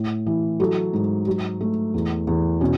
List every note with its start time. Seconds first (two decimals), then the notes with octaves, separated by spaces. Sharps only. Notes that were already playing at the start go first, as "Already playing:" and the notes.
Already playing: A2
0.26 E3
0.60 F#3 A4
0.93 G#2
1.27 F#3
1.61 A3
1.94 E2
2.27 E2
2.61 B2 C#4